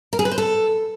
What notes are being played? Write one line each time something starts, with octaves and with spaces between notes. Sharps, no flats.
A#4
G#4
B4
C5
A4